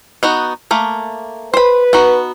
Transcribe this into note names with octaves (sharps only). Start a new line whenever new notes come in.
B3 D#4 F#4
A3 A#3
B4 C5 B5
B3 D#4 F#4